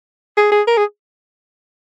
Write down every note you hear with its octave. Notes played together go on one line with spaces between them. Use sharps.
G#4
G#4
A#4
G#4